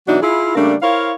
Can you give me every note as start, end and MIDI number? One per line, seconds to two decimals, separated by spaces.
0.07 0.20 47
0.07 0.20 52
0.07 0.20 54
0.07 0.20 62
0.07 0.20 63
0.07 0.20 66
0.22 0.55 64
0.22 0.55 65
0.22 0.55 68
0.55 0.74 49
0.55 0.74 55
0.55 0.74 57
0.55 0.74 58
0.55 0.74 62
0.83 1.13 64
0.83 1.13 70
0.83 1.13 72
0.83 1.13 73
0.83 1.13 77